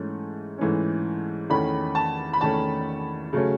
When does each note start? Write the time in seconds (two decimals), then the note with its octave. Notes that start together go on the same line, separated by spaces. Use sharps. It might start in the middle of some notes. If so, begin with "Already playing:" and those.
Already playing: G#2 E3 A3 C#4
0.58 G#2 E3 A3 C#4
1.50 E2 D#3 A3 C#4 B5
1.95 A5
2.33 B5
2.41 E2 D#3 A3 C#4 A5
3.33 C#3 F#3 A3 C#4